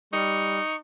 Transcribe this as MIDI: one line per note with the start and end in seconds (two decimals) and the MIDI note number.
0.13 0.58 55
0.13 0.76 63
0.13 0.76 85